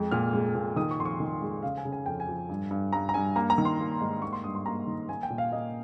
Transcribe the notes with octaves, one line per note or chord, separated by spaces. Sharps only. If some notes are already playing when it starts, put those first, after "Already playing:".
Already playing: F2 G#3
A#2 F6
G#3
A#2
D#3 D#6
C#6
F2 C6
C#6
D#3
G#3
C#3 F5
G#5
C#3
G#5
F2 G5
G#5
F3
G2
G2
G2 A#5
A#5
G2 G#5
A#3 A#5
A#5
D#3
C6
A#3
G#2
A#3 C#6
C6
G2 D#6
C6
A#3 A#5
D#3
A#3 G#5
G5
A#2
F5
A#3 D#5